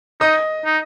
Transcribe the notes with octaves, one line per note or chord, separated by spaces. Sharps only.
D#4 D#5 D#6
D#4